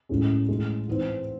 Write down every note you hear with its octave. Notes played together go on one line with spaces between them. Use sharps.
A1 A2 G#3 C#4
A1 A2 G#3
G#2 E3 C4